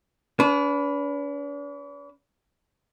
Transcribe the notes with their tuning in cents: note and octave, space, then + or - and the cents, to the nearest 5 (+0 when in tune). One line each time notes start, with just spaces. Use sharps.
D4 -45 B4 +0